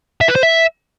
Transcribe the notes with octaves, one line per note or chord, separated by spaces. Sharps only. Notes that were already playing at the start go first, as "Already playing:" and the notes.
E5
B4
C5
E5